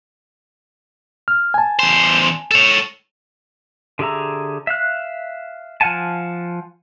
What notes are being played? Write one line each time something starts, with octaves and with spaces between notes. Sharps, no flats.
F6
G#5 A5
E2 C5
A4 C#5
D3 G4 G#4 E5 A#5
E5 F5 F#6
F3 F5 F#5 G#5 A5